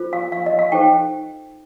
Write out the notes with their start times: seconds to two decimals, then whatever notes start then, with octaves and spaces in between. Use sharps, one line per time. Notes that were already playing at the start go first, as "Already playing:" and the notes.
Already playing: F4 A4 C5
0.13 F5
0.32 F5
0.46 D#5
0.59 F5
0.72 D#4 A4 C5 G5